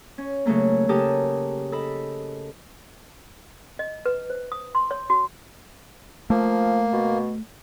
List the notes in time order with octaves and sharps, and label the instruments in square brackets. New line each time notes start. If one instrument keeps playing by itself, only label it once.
[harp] C#4
C#3 F#3 A3 A#3
C#3 G4 A4 A#4 A5 D#6
A4 D#5 B5
[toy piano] D#5
B4
C5
D#6
C6
C#5
F#4
[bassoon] F3 [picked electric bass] A3 [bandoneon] A#3
[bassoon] B2